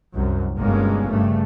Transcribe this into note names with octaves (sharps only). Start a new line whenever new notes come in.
C2 F#2
G1 G2 B2 G#3 A#3 C#4
G2 C#3 A3